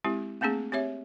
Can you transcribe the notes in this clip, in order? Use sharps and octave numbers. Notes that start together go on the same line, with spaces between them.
G#3 C4 E4 G4
A3 A#3 C4 D4 G#4
C4 G4 C#5 E5